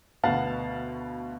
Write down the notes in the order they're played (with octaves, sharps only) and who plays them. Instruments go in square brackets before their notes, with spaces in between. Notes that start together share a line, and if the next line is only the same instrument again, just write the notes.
[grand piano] D2 B2 B3 F5 F#5 A5